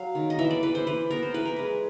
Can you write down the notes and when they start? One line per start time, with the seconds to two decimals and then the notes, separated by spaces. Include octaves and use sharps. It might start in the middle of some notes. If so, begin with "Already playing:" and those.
Already playing: F#3 F5
0.15 D#3
0.30 D#5
0.39 E3 E5
0.51 D5
0.63 E3 B4
0.75 C5
0.87 E3 B4
1.11 B3 A#4
1.22 C5
1.34 E3 B4
1.45 A#4
1.56 G#3 B4